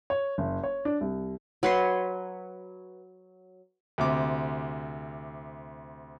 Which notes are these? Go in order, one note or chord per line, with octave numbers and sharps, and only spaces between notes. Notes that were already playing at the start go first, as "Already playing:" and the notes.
C#5
F#1
C#5
D4
C2
F#3 B4 C#5 C6
D2 C3 D6